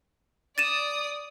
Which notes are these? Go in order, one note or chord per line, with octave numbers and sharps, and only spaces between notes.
D5 D#6 A6 D#7 E7